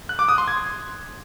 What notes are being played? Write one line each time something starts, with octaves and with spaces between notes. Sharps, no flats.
F#6
D6
D#6
C6
G#6